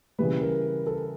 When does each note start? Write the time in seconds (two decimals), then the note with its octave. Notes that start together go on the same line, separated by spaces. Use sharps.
0.19 C#3 E3 G3 B4
0.41 A#4
0.87 A4